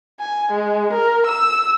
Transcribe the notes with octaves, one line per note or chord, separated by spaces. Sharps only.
G#5
G#3
A#4
E6